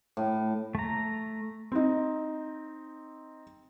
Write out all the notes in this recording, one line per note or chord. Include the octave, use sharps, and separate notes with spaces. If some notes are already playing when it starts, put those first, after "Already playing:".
A2
A3 A#5
C4 D#4